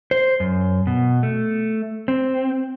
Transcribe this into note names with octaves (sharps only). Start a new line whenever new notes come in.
C5
F#2
B2
A3
C4